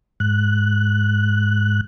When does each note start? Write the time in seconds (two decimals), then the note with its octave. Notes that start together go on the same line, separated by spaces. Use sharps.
0.20 G#2 F#6